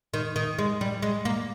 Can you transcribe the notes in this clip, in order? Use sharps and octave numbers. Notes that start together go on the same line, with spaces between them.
D#3
D#3
G#3
G3
G#3
A#3